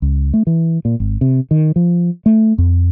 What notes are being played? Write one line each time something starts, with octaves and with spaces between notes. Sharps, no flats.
C#2
A3
E3
A#2
G#1
C3
D#3
F3
A3
F2